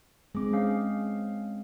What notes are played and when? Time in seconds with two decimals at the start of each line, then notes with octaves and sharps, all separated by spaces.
0.35 G#3 C4 G#4 D6
0.53 C#4 F5